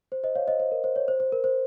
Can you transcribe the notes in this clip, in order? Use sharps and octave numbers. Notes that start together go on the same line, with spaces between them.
C5
C5 D#5
C#5 F5
C5 D#5
C5
A#4
C5
C#5
C5
C5
A#4
C5